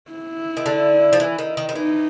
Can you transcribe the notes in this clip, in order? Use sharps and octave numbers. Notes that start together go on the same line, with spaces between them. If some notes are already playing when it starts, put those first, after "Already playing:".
E4
D#3
D3
F3
E3
D#3
D#3
D#3
E3 D#4